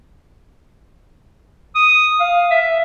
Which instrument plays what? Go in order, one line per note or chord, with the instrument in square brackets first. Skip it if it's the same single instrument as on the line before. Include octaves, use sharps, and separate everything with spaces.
[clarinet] D#6
F5
E5